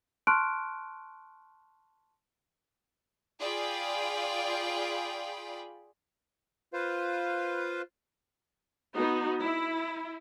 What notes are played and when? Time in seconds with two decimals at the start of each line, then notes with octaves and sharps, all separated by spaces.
0.27 A5 C6 C#6 F6 F#6 D7
3.39 F4 G#4 D5 G5 B5
6.73 F4 B4 C5 F5
8.96 B3 D#4 F#4
9.40 E4